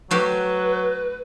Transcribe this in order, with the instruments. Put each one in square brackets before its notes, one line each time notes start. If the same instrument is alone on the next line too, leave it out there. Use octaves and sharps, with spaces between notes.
[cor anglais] F#3 [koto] A3 F#4 G4 [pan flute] B4